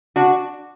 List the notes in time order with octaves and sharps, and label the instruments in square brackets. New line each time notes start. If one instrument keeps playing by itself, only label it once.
[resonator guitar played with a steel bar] D4 F#4